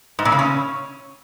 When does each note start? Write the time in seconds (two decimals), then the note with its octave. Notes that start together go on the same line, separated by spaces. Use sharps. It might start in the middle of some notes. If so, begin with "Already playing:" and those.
0.19 G#2
0.25 A#2
0.32 C#3
0.39 C#4